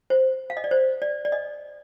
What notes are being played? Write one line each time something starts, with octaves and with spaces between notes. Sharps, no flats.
C5
F5
D#5
D5
C5
D5
D5
D#5